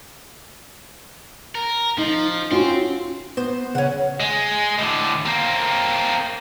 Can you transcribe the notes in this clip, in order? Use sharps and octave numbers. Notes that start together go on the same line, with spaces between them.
A#4
F3 D#4
C#4 F4 F#4 G5 C6
B3 C5
C#3 C#4 F#5
G#3
A2 D3
A#3 C4